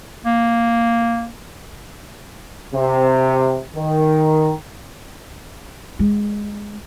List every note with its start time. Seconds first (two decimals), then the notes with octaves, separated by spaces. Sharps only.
0.24 A#3
2.74 C3
3.75 D#3
5.99 G#3